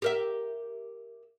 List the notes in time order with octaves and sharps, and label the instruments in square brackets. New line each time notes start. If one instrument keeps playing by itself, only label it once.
[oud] G4 A#4 E5